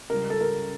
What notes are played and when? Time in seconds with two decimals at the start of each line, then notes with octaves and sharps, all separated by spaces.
0.10 C#2 C#3 G3 A#4
0.30 A4
0.41 A#4